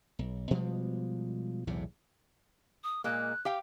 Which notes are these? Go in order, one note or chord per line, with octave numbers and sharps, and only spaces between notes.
B1
B2 F3 G3 G#3
B1 E2 A2 C3
D#6
A#2 G#3 A#3 F#6
G4 F5 G5